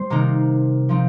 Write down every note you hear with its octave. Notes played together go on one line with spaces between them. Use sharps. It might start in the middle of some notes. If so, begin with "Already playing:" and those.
Already playing: G3 C5
C3 D#3 A#3 D#4
F3 C4 D#4